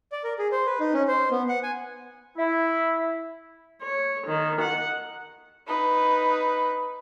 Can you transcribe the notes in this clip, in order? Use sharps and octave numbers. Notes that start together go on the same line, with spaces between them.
D5
A#4
G#4
C5
B4
D#4
C#4
C5
B3
F#5
G#5
E4
C#5
D#3
F#5
D#4 B4